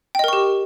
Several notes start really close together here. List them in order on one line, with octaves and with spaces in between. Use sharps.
G5 D#5 A#4 C#6 G4